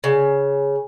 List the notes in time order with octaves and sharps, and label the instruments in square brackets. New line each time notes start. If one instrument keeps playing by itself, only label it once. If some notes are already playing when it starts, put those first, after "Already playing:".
[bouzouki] C#3